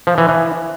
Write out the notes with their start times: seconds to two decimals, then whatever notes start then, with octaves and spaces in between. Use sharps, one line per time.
0.07 F3
0.18 E3
0.29 E3